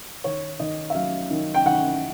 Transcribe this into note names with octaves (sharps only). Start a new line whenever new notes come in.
D#3 C#5
D#3 D#5
E5
F#3 F5
D#3
G5
D#3 F#5